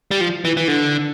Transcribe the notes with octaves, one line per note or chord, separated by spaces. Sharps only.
G3
F3
E3
E3
D3